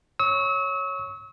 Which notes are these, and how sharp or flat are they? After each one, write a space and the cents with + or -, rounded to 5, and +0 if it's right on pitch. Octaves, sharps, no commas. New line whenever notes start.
C#5 +0 C#6 +0 E6 -40